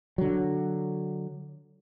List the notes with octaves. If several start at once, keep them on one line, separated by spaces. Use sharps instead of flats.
D3 F#3